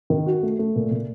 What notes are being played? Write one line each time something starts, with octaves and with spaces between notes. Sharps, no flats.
D#3
F#4
A3
A3
A#2
A#2